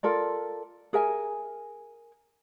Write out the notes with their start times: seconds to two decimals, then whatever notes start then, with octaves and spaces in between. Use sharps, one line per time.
0.03 F4 A4 A#4 D5
0.93 G#4 A#4 E5 G#5